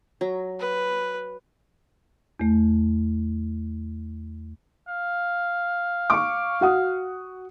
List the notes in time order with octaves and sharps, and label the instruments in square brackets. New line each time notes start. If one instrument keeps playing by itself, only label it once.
[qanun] F#3 A#5
[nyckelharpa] B4
[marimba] E2 A3
[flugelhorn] F5
[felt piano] C#6 D6
F#4 F#5 D#6